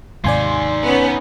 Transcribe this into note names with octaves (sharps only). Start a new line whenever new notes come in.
D#2 G#2 C3 D#4 D5 F5 G#5 C6
B3 C#4